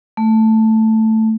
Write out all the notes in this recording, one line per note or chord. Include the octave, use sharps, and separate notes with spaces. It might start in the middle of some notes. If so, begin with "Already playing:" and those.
A3